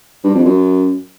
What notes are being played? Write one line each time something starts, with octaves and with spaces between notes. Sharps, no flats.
G2
F2
F#2